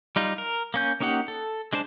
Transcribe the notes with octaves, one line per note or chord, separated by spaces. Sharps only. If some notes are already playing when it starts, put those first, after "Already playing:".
G3 D#4 F4
A#4
A#3 C#4 G6
A#3 C#4 D#4 G4 F#5
A4
G#3 D4 C5 A5